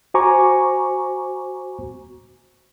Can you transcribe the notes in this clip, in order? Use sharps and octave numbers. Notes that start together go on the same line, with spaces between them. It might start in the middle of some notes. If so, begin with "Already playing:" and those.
F#4 C5 G#5 A#5 C#6 D6